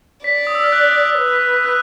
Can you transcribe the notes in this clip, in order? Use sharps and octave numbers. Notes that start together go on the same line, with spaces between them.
D5 B6
D#6
E6
F6
F#6
B4
F#6